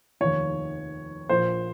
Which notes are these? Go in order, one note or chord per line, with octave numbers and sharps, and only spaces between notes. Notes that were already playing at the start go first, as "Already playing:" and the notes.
F1 D#2 D#3 C#5
A#1 A#2 F3 C5